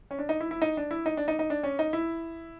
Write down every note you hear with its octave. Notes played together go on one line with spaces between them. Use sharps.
C#4
D4
D#4
E4
E4
D#4
D4
E4
D#4
D4
D#4
D#4
D4
C#4
D#4
E4